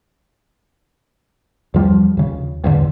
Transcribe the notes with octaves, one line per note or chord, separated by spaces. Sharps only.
E2 F3 G3
D#2 C#3
A1 E2 D3